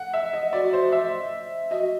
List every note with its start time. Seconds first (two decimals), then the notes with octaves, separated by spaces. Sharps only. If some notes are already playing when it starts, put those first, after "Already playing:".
Already playing: F#5
0.13 E5
0.33 D#5
0.53 F#4 D5
0.73 C5
0.92 E5
1.71 F#4 D#5